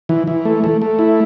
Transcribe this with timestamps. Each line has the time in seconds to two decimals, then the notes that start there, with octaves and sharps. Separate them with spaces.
0.09 E3
0.27 E3
0.45 A3
0.64 A3
0.82 A3
0.99 E4